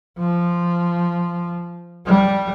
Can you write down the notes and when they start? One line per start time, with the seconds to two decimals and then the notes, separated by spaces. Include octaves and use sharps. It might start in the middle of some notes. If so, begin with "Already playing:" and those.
0.18 F3
2.06 G3